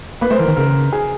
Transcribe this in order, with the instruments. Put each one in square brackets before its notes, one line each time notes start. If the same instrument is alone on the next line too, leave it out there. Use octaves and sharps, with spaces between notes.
[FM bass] A#3 [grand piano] B4
[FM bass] A3 [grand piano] C5
[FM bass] E3 [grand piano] A#4
[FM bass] D#3
[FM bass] C#3 [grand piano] A#4
[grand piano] G#4